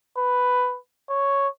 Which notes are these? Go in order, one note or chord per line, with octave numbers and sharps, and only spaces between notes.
B4
C#5